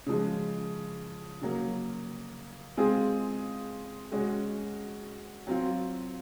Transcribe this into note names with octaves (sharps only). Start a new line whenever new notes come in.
C#3 F3 G#3
C#3 F#3 A#3
G#3 C4 F4 G#4
G#3 C#4 F#4
F#3 C4 F4